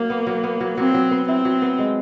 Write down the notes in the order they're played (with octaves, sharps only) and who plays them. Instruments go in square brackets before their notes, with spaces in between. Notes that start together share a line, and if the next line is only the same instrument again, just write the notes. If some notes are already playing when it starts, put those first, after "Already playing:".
Already playing: [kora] F#3 [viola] A#3
[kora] B3
F#3
B3
F#3
[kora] F#3 [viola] C4
[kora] F#3
B3
[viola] C4 [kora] E4
[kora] F#3
B3
G#3